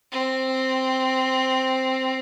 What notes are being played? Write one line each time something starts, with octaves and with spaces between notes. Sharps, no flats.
C4